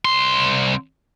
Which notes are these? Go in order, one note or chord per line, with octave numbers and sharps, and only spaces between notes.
C2 C6